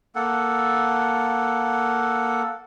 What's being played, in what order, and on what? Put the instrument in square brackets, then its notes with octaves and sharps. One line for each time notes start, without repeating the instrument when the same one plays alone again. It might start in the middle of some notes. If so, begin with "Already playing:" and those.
[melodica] A#3 A4 F#5